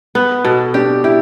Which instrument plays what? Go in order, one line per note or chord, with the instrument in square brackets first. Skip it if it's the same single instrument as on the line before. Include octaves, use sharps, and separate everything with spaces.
[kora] B3 [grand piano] B4
[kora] B2 [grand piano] A4
[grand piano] D4 [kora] G4
[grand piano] E4 [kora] G4